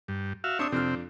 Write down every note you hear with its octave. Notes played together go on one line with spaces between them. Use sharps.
G2
F#4 E5 F5
C4 D4 C#5 E5 D#6
F2 C3 C4 D4 F6